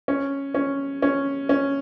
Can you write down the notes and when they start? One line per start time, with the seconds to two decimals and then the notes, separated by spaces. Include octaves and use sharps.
0.08 C#4
0.54 C#4
1.02 C#4
1.49 C#4